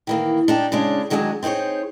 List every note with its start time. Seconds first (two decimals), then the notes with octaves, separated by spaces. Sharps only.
0.07 D#3 E3 A#3
0.48 D4 D#4 G4
0.72 C#3 G#3 C#4 D4
1.10 D#3 F#3 G#3 D4 D5 G#5
1.43 C4 D#4 G#4 C5 C#5